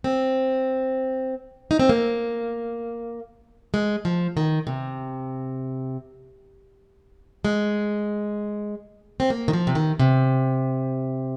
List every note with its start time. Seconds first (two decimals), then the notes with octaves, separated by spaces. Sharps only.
0.04 C4
1.71 D#4
1.79 C4
1.89 A#3
3.74 G#3
4.05 F3
4.37 D#3
4.67 C3
7.45 G#3
9.20 C4
9.30 A#3
9.48 D#3
9.53 F3
9.67 C3
9.75 D#3
9.99 C3